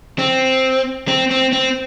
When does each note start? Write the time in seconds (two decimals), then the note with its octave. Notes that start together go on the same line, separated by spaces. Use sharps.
0.19 C4
1.08 C4
1.30 C4
1.53 C4